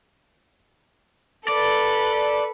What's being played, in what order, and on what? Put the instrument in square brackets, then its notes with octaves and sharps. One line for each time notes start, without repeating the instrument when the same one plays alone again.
[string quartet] A4 B4 [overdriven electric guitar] D5